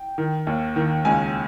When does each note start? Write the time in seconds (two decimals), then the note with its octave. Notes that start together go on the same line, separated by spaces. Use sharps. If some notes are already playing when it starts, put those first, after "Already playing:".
Already playing: G5
0.18 D#3
0.47 D#2
0.76 D#3
1.05 C#2 G#5